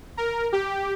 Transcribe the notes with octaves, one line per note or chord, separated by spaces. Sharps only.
A#4
G4